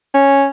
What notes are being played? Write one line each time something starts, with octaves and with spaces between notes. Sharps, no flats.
C#4